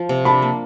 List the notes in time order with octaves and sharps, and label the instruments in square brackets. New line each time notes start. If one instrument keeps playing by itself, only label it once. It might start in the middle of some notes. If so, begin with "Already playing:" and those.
Already playing: [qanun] F3
C3
[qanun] D4 [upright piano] A5 B5
[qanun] A#3